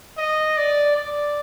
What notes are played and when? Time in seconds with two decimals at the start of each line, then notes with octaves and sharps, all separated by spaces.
0.18 D#5
0.57 D5
0.96 D5